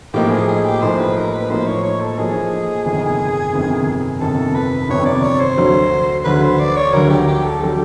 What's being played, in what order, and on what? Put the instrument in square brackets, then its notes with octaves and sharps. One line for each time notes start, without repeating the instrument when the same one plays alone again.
[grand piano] A2 F3 A#3 D#4 [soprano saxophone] G4
[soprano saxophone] G#4
G#4
G4
[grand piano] A2 F3 A#3 D#4 [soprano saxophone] C5
[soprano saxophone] B4
A#4
B4
[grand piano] A2 F3 A#3 D#4 [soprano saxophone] C5
[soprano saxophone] C#5
C#5
A4
[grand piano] A2 F3 A#3 D#4 [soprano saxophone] G#4
[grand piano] G1 F2 C3 D#3
G1 F2 C3 D#3
[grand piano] G1 F2 C3 D#3 [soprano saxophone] A4
[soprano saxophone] B4
[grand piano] G1 F2 C3 D#3 [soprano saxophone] C#5
[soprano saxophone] D5
C#5
C5
[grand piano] D2 D3 F#3
[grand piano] D2 D3 F#3 [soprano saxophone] B4
[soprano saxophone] C5
D5
C#5
[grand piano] D2 D3 F#3 [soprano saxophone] A#4
[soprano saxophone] G4
G4
A4
[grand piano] D3 F#3 [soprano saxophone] G4